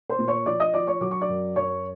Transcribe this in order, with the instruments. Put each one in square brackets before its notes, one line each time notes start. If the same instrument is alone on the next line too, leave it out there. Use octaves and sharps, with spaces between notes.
[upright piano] C5 C6
A#2
C#5 C#6
F3 D5 D6
D#5 D#6
F3 D5 D6
C#5 C#6
F#3 D6
C#6
D5 D6
F#2
F#2 C#5 C#6